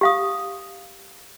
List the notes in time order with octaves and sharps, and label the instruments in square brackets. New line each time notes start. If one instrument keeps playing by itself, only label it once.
[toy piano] G4 F5 D#6